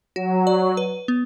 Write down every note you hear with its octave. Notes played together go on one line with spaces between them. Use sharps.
F#3 F#4
D5
B4
B3